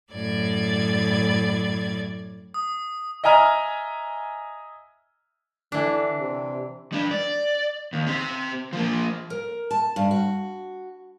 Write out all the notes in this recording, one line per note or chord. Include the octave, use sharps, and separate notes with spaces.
F#2 A2 D5 G#6
D#6
D#5 E5 G#5 A#5 F6
D3 E3 D4
C3
G3 D4
D5
D#2
C4 G4
F3 A#3
A#4
A5
G2
F#4